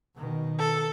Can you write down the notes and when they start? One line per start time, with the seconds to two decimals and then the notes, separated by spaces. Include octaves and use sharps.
0.16 B2 D#3
0.59 A4